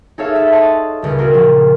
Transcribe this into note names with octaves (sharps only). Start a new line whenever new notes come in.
D#4 G#4 A4 C#5 E5 F5
E5 A5
C#5 D#5 F#5 A5 C6
D#1 C#2
C4 F4 F#4 G#4 A#4
A#2 C#3 F3 D4